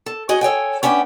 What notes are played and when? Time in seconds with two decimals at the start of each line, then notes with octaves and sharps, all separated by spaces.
0.06 A4
0.29 F#4 G#4 D#5
0.41 A4 C#5 G5 G#5
0.83 B3 C#4 D4 E5 G5